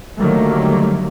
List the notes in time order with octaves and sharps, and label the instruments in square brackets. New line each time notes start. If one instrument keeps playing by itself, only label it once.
[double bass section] D3 D#3 F#3 G3 A3 A#3